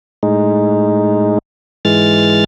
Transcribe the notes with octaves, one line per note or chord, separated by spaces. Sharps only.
A2 G#3 D#4
G#2 E3 G#3 F6 A6